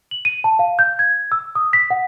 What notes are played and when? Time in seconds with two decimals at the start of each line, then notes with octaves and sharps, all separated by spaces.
0.11 F#7
0.25 D#7
0.44 A5
0.59 F5
0.79 G6
0.99 G#6
1.32 E6
1.55 D#6
1.73 B6
1.90 F#5